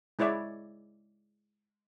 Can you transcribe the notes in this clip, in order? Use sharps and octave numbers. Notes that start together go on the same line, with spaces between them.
G#3 E4 C#5 D5 E5